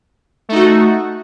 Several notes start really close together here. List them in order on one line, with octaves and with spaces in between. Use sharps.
A3 D#4 F#4